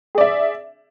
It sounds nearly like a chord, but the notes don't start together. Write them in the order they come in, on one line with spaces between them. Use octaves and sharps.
G#4 D5 E5